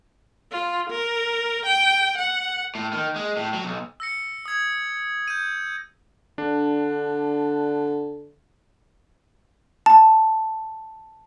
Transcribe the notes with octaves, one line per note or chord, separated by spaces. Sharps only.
F4
A#4
G5
F#5
A2
D#3
G#3
A2
F#3
B1
E6 A#6 C#7
D#6 G#6
G6 D#7
D3 D4
A5